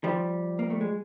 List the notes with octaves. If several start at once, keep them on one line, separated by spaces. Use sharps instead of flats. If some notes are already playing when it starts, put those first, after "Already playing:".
F3 G3
A#3
A3
G#3